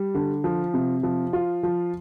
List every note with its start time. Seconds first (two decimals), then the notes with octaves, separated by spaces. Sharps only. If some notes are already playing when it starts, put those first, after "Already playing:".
Already playing: G3
0.15 D3
0.44 F3
0.74 C3
1.03 F3
1.33 F4
1.63 F3